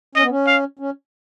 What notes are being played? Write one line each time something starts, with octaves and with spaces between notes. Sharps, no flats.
C#4 D#5
B3
C#4
F5
C#4